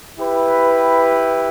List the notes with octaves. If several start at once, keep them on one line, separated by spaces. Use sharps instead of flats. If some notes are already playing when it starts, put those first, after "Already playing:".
E4 G4 B4